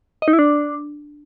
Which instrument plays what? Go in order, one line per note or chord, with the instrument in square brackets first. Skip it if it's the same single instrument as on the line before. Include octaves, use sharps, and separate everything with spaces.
[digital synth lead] D#5
D#4
E4
D4